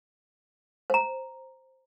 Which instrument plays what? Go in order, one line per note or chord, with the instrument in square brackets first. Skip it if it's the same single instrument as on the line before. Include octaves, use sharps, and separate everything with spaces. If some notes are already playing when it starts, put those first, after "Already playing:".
[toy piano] C5 A#5